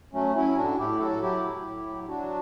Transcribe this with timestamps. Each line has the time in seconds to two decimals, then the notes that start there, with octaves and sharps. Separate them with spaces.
0.13 F#3 A3 C#4
0.35 F#3 C#4 E4
0.57 A2 D4 F#4
0.78 A2 E4 G4
1.00 F#3 F#4 A4
1.21 F#3 E4 G4
1.44 A2
1.65 A2
1.86 F#3
2.08 F#3 D4 F#4